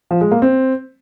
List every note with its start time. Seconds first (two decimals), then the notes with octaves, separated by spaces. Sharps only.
0.11 F3
0.21 G#3
0.32 A#3
0.42 C4